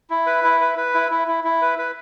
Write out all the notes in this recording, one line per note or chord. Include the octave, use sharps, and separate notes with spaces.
E4
B4
E4
B4
B4
E4
E4
E4
E4
B4
B4